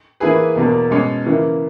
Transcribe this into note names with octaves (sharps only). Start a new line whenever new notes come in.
E3 A#3 E4 G#4 B4
E2 B2 A#3
B2 G#3 C#4
C#3 E3 A#3 E4